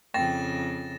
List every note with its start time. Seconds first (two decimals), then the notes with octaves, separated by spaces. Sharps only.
0.14 F2 C#3 G5 A6 A#6 E7